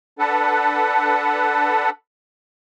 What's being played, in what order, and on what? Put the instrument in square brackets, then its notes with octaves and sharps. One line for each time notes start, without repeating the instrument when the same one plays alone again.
[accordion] D4 A4 B4 F#5